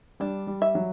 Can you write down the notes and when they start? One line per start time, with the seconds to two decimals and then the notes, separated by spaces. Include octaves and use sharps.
0.20 G3 D4
0.47 G3
0.62 E5
0.75 F#3